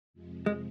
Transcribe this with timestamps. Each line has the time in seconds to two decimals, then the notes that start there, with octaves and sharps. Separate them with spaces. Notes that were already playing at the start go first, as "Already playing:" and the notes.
0.13 F2 C3 F3 G#3
0.46 G#3